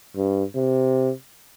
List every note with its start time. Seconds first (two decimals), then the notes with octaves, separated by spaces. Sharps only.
0.16 G2
0.55 C3